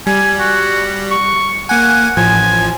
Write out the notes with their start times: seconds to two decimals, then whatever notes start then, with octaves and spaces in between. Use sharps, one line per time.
0.07 G3 G#5
0.40 F#4
1.11 C#6
1.69 A#3 F#5 G#5
2.17 A1 F3 G#5